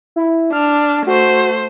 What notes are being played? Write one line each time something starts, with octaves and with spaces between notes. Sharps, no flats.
E4
D4 F6
A3 F#4 C5